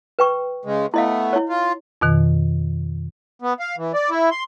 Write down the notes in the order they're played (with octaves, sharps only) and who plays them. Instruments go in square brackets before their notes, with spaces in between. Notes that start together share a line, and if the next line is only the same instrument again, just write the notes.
[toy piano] B4 G5 C#6
[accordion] C#3 G#3
[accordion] A3 B3 [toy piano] E4 D#5 F5
[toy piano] E4 C#5
[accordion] F4
[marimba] F2 B2 D#3
[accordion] B3
F5
E3
D5
E4
C6